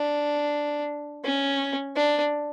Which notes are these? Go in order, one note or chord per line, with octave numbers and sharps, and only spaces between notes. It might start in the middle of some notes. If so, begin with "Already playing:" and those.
Already playing: D4
C#4
D4